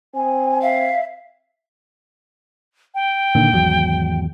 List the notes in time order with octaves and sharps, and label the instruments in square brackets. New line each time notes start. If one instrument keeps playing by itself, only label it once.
[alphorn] C4 [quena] G#5
[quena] E5 [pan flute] F5
[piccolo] G5
[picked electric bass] A#2 D3 D#3
G#1 E2 F#3